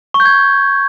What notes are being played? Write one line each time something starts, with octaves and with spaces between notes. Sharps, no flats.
C#6
G6
G#6